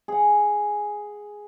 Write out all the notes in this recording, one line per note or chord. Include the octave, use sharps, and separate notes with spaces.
G#4 F#5